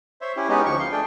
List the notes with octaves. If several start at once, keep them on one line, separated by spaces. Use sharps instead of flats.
C5 C#5 E5
C#4 E4 G4
G#3 B3 C#4 D#4 G4
D2 F3 C#6
F5 C6
A3 D4 G#4 G5